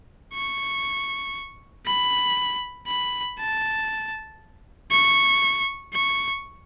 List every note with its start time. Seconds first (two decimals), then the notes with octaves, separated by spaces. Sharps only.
0.34 C#6
1.86 B5
2.87 B5
3.39 A5
4.91 C#6
5.94 C#6